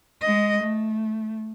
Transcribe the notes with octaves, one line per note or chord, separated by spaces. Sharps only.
G#3 D#5
A3